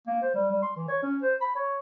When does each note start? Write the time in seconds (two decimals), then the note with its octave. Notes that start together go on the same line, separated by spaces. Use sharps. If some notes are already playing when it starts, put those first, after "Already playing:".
0.07 A#3
0.21 C5
0.34 G3
0.51 G3
0.62 C6
0.76 E3
0.88 C#5
1.02 C#4
1.22 C5
1.41 B5
1.55 C#5